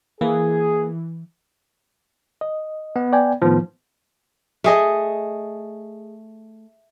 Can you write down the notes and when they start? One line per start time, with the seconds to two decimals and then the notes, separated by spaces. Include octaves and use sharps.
0.21 E3 A#3 G#4
2.41 D#5
2.96 B3
3.13 D5 G5 G#5
3.42 A2 D#3 F3 B3
4.64 A3 G#4 D#5